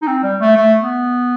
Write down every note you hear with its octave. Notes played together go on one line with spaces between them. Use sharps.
D#4
C4
G3
A3
A3
B3